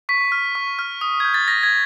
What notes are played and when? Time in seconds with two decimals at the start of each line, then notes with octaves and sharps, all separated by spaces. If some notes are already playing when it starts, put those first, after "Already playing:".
0.09 C#6 B6
0.32 F6
0.55 C#6
0.79 F6
1.01 D#6
1.20 G6 G#6
1.34 A6
1.48 D#6 A#6
1.63 G#6